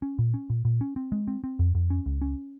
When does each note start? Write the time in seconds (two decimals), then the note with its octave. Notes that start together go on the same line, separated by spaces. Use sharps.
0.02 C#4
0.19 A#2
0.34 C#4
0.50 A#2
0.65 A#2
0.81 C#4
0.96 C4
1.12 G#3
1.28 C4
1.44 C4
1.59 F2
1.75 F2
1.90 C#4
2.06 C#2
2.22 C#4